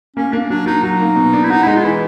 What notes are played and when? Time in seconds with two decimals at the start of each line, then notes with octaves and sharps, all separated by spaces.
0.16 A#3 C#4
0.33 A#3 D4
0.50 F#3 D4
0.66 F#3 D#4
0.83 F#3 D#4
1.00 A#3
1.16 B2
1.33 D4
1.44 E4
1.50 D#4 F#4
1.63 E4
1.66 G#3 D#4
1.76 F4
1.84 E3 E4